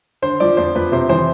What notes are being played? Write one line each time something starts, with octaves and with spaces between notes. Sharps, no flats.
D3 C5
F3 D5
F2 C5
F2 B4
C3 C5
E3 C5